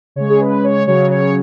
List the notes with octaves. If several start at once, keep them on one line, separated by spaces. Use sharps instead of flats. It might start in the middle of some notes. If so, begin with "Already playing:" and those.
C#3 G#3 C#5
G#4
B4
C#5
C#3 F#3 C#5
C#5